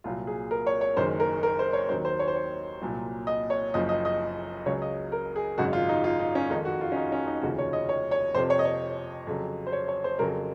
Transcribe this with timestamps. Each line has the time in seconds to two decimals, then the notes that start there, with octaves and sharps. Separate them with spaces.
0.04 C2 A#2 F#3 F4
0.27 G#4
0.51 A#4
0.67 C#5
0.81 C#5
0.96 F#1 F#2 D#3 G#3 C5
1.20 A#4
1.43 A#4
1.59 C5
1.73 C#5
1.89 D#2 D#3 F#3 C5
2.05 C5
2.19 C#5
2.28 C5
2.36 C#5
2.82 C2 A#2 F#3
3.27 D#5
3.50 C#5
3.74 F#1 F#2 F3 D#5
3.89 D#5
4.05 D#5
4.66 C#2 C#3 F#3 C#5
4.82 D#5
5.12 A#4
5.36 G#4
5.58 G#1 F#2 C#3 G#3 F#4
5.73 F4
5.89 D#4
6.04 F4
6.19 D#4
6.35 C#4
6.50 F2 D#3 G#3 D#4
6.65 F#4
6.81 F4
6.92 C#4
6.96 D#4
7.12 C#4
7.27 D#4
7.42 F1 D#2 C#3 F3 F#4
7.58 C#5
7.73 D#5
7.89 C#5
8.11 C#5
8.34 F2 C3 F3 C5
8.50 C#5
8.59 D#5
8.65 C#5
9.27 F2 C#3 F#3
9.67 C5
9.72 C#5
9.88 C#5
10.04 C5
10.19 F2 C#3 F#3 A#4